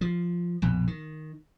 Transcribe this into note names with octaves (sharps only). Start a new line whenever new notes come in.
F3
A#1 F2 B2
D#3